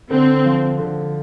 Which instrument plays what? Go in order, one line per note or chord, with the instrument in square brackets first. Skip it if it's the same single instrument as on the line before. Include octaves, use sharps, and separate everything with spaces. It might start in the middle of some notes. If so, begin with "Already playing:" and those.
[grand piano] D3 [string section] C4
[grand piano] F3
D3